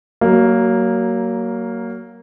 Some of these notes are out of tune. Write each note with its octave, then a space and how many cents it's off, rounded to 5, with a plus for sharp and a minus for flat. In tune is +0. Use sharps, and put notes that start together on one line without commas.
F#3 +25 A#3 +0